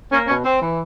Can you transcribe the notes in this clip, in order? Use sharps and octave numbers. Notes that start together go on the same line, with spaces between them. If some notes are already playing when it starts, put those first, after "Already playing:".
A#3 C#4
B2 C#4
C4
E3